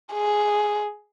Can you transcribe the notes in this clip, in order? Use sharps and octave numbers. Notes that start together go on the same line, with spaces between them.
G#4